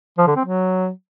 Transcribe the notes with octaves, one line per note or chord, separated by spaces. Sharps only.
F3
D3
C4
F#3